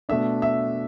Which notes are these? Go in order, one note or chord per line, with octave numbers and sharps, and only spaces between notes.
B2 A3 D4 E5
E5